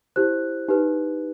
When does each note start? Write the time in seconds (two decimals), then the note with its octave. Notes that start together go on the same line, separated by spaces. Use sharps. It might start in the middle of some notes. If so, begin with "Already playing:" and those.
0.16 E4 G4 C5 F#6
0.68 D#4 G4 B4